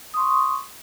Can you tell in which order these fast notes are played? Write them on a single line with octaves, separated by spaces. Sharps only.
D#6 C6 C#6